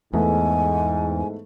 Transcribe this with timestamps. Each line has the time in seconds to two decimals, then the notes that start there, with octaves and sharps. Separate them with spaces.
0.13 E2 G#2 E3 A3 B3 G#5